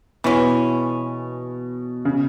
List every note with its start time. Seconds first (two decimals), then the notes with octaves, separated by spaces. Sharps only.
0.24 B2 E3 G#3 C#4
2.05 C#3